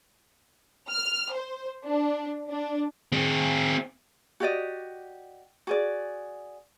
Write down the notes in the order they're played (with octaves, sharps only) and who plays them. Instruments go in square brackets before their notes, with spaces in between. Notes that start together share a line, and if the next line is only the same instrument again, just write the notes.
[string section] F6
C5
D4
D4
[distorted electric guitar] C4 G#4
[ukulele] F#4 G4 D5 D#5
F#4 G#4 D5